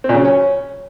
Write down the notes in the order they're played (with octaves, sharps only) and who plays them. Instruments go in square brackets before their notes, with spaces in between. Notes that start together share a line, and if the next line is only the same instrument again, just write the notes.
[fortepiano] C4
A#2
C#3
F#3
C#4